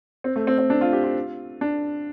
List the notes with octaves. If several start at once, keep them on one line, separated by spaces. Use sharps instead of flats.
C4
A3
C4
C4
D4
F4
G4
F4
D4